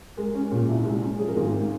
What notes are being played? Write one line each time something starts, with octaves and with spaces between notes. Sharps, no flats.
G#3 A#4
C#4
A#2
C2
G#3
C#4
F3 G#4
A#4
G#1 G#4
G#2